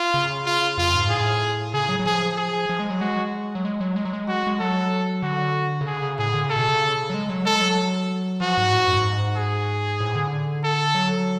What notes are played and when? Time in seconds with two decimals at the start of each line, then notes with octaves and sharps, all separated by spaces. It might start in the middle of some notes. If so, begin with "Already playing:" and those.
Already playing: F4
0.14 C#3
0.46 F4
0.78 F2 F4
0.95 G#2
1.09 A2 G#4
1.73 C#3 G#4
1.89 F#3
2.00 F#3
2.06 F3 G#4
2.37 G#4
2.69 F3
2.80 G#3
2.90 F#3
3.00 G#3 F#4
3.55 F#3
3.65 G#3
3.81 F#3
3.96 G#3
4.05 F#3
4.13 G#3
4.28 F#4
4.47 G#3
4.59 F#3 A4
5.23 D3 F#4
5.81 C#3
5.86 D3 G#4
6.02 C#3
6.19 A2 G#4
6.34 D3
6.45 C#3 A4
6.56 B2
6.68 C#3
7.10 F#3
7.14 G#3
7.30 F#3
7.45 G#3 A4
7.61 F#3
8.40 F3 F#4
8.57 G#2
8.73 A2
8.81 G#2
8.88 F#2
8.97 G#2
9.36 G#4
10.01 A2
10.16 D3
10.64 A4
10.95 F#3